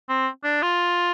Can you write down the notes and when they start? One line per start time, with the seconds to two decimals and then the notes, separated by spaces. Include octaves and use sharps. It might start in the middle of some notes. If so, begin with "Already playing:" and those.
0.09 C4
0.44 D4
0.62 F4